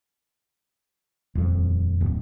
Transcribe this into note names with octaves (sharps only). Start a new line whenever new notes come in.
D#1 F2
D1